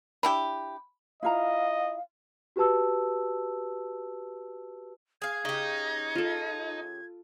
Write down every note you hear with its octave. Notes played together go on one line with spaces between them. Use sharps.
D4 E4 G4 B5
E4 F4 D#5 F5 A#5
F#4 G4 B4 A5 E6
G#4 F5 G#6
C#3 D#4 G4
F4 A4